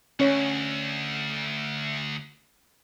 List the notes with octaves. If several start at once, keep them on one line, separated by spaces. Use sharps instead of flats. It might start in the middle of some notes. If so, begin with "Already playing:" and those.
D2 C#4 C#5